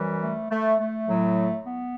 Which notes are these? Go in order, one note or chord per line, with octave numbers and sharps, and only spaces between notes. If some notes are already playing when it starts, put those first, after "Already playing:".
Already playing: F#2 E3 G3
A3
A3
A3
A2 F#3
B3